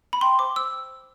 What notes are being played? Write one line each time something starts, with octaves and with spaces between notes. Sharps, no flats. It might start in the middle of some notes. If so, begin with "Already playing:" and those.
B5
G5 C6
C5 D6
C5 E6